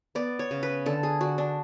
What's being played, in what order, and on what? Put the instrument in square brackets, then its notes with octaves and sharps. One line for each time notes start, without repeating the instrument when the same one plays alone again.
[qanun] B3 D5
C#5
C#3
B4
D3 A4
G#4
D3 F#4
D4